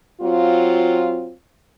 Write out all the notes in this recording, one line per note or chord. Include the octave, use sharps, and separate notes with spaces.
F#3 C4 F4